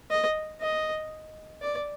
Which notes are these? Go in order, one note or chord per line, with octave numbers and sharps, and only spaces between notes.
D#5
D#5
D5